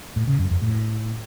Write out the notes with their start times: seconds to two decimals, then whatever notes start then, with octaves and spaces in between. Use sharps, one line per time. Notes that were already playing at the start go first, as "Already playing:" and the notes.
0.16 A2
0.27 C#3
0.39 F#2
0.50 F2
0.62 A2